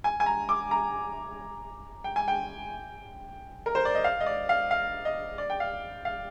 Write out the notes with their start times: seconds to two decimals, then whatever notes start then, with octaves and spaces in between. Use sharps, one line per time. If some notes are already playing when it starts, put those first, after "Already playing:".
0.04 G#5
0.20 G#5
0.26 A#5
0.49 D6
0.71 A#5
2.04 G5
2.16 G#5
2.28 G5
3.66 A#4
3.75 C5
3.85 D5
3.95 D#5
4.04 F5
4.20 D#5
4.26 D5
4.49 F5
4.71 F5
5.05 D#5
5.38 D5
5.50 G5
5.60 F5
6.05 F5